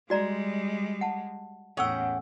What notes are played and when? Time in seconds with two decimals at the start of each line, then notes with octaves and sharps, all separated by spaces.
0.10 G3 G#3 F#4 D5 A#5
1.01 F#5 A5
1.77 E2 A2 C#4 A4 F#5 G5 E6